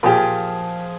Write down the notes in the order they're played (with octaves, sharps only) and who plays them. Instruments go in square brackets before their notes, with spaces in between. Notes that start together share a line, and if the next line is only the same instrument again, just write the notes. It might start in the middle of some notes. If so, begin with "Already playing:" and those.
[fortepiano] A#2 G4 [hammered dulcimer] F3 G#4